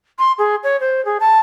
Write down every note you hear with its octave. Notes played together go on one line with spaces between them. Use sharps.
C6
G#4
C#5
C5
G#4
A5